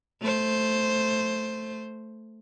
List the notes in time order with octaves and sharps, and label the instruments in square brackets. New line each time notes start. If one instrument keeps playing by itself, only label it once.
[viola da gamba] A3 C5